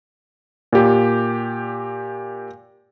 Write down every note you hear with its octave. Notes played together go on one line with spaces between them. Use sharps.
A#2 G4